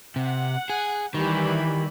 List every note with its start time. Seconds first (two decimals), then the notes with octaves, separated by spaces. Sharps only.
0.16 C3 F#5
0.70 G#4
1.14 D#3 E3 G3 B5